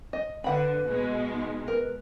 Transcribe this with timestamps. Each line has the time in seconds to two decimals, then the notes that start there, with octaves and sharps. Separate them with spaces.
0.13 D#5
0.44 D3 B4 F#5 B5
0.85 B2 G#3
1.32 D#4
1.68 A#4 B4